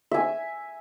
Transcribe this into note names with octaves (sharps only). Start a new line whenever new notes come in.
E5 G#5